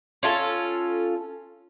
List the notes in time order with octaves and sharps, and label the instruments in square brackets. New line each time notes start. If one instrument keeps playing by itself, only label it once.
[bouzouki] C#4 F4 A4